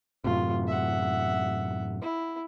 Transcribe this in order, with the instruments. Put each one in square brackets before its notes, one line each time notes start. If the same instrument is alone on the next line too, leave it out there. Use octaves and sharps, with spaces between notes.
[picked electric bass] F#2 A2 C3 [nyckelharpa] F4
[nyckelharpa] E5 F#5
E4